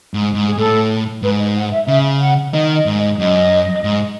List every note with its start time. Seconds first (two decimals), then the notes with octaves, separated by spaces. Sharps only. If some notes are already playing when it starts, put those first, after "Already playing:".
0.14 G#2
0.35 G#2
0.47 G#4
0.57 A2 A4
1.22 G#2 B4
1.38 D#5
1.55 F#5
1.72 E5
1.88 C#3 E5
2.21 F#5
2.53 D#3 D#5
2.76 D#5
2.86 G#2
2.98 D#5
3.19 F#2 D#5
3.84 G#2